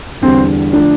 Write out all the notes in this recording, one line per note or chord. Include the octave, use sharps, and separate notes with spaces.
E2 D3 G3 C4
D3 F3 A3 D4